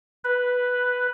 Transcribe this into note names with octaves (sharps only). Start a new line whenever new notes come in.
B4